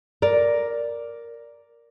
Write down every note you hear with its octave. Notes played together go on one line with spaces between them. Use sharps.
A#4 D5